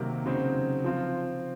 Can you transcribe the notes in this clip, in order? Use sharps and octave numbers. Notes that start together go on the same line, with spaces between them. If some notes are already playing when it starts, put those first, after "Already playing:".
Already playing: C3 D#3 F#3 A#3
C#3 F#3 C4 D#4
F3 C4 F4